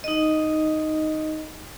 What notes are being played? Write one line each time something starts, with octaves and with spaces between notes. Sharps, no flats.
D#4 D#5